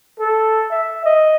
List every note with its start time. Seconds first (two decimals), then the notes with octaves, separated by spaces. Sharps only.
0.19 A4
0.71 E5
1.06 D#5